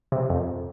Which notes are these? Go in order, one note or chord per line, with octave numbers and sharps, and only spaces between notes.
C3
F2